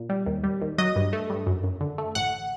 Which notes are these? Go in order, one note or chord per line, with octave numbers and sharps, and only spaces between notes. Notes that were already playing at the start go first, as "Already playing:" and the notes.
Already playing: A#2
G3
D#2
G3
D#2
F#3 D#5
G2
A3
G2
F#2
F#2
D3
A3
A1 F#5